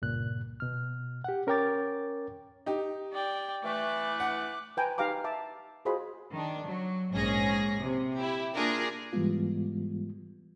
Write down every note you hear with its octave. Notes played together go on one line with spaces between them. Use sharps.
C#2 G2 A#2 F#6
B2 F6
G4 F#5
C#4 A#4 C#5 G5 D6 A6
D#4 G4
D5 G5
E3 A3 D6 F#6
F#5
B4 G5 G#5 A#5
D#4 G4 B4 F5 A#5 D6
E5 A5 D6
F4 F#4 G#4 C5 D#5 B5
D#3 D4
F#3
A#1 G#2 C#4 G#4 A#6
C3
E4 G4
A#3 D4 F4 G#4 A#4
G#2 E3 G3 G#3 B3 F4